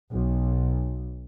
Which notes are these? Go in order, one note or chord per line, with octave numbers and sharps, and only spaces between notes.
B1